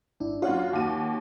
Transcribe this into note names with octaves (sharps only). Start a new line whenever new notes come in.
G#1 D4 E4
F#2 F4 F#4 C#5 F#5
D#2 D#7